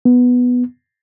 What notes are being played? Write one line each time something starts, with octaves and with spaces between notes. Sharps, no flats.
B3